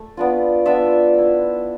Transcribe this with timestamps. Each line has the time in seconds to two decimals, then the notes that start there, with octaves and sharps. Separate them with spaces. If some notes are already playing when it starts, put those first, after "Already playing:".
Already playing: A3
0.17 B3 D4 F4
0.65 B3 D4 F4 E5
1.14 A3 E4